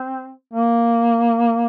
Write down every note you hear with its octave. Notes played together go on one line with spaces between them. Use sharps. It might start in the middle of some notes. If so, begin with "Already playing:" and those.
Already playing: C4
A#3